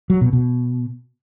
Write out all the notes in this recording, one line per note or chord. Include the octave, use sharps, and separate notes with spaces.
F#3
B2
B2